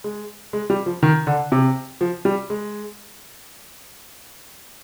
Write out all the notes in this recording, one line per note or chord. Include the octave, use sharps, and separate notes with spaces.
G#3
G#3
G3
F3
D#3
D3
C3
F3
G3
G#3